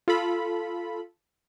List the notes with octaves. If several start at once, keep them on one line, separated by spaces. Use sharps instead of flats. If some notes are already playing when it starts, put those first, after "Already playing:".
F4 A4 B5